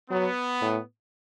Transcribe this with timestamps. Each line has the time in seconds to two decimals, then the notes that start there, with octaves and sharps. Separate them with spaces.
0.10 F#3 B3
0.61 A2